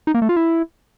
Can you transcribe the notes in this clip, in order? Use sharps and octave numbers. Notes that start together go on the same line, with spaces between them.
D#4
A#3
A3
F4
E4